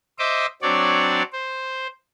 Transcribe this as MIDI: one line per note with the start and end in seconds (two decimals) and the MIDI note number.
0.19 0.46 72
0.19 0.46 75
0.19 0.46 76
0.19 0.46 86
0.62 1.23 54
0.62 1.23 60
0.62 1.23 62
0.62 1.23 73
0.62 1.23 74
1.32 1.87 72